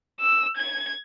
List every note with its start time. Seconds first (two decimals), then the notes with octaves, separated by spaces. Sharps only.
0.21 E6
0.57 G#6